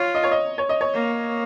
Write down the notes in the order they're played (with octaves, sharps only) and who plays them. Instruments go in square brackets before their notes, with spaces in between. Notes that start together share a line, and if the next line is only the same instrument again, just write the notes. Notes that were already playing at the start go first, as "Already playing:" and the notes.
Already playing: [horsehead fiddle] F4 [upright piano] C#5
[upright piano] D#5
C#5
D#5
C#5
D#5
C#5
[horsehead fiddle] A#3